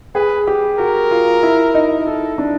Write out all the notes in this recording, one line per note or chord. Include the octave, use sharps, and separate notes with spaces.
G#4 B4
G4
F#4 A#4
F4
E4
D#4
E4 A4
D4